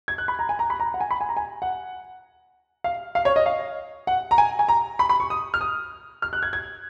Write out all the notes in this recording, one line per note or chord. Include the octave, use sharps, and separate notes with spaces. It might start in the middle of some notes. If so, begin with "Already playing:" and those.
G#6
F#6
B5
A#5
G#5
A#5
B5
A#5
F#5
G#5
B5
G#5
A#5
G#5
F#5
F5
F5
C#5
D#5
F5
F#5
A#5
G#5
G#5
A#5
B5
B5
C#6
D#6
F6
D#6
F6
F#6
G#6
G#6